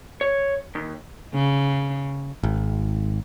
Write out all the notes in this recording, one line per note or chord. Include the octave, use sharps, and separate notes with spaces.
C#5
D#2
C#3
G#1